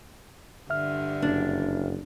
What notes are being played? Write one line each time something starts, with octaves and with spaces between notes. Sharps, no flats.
G2 D3 E5 F6
F#1 D4